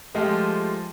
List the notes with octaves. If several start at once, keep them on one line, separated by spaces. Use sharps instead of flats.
F3 G#3 A3 F4 G4